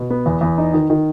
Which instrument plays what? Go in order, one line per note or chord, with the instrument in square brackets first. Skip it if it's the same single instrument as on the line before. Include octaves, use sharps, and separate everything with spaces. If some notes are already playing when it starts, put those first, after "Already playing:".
Already playing: [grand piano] B2
B3
E2
E2
D#4
D#3
D#3